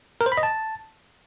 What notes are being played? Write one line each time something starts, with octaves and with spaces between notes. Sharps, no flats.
A#4
C5
B5
D#5
A5